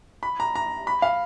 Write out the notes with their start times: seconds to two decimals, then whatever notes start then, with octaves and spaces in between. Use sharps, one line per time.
0.23 B5
0.40 A#5
0.55 A#5
0.87 B5
1.02 F5